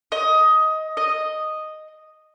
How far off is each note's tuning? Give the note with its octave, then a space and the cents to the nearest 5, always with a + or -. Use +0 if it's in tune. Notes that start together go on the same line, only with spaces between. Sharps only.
D#5 +15
D#5 -5